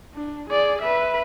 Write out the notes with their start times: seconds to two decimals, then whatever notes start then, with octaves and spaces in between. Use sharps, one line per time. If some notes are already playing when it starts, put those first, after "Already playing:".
0.14 D4
0.49 G#4 D5
0.82 B4 E5